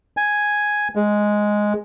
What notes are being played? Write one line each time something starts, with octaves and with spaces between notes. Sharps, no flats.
G#5
G#3